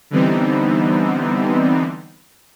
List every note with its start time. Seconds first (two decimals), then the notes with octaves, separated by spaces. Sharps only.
0.11 D3 E3 G3 B3 C4 D#4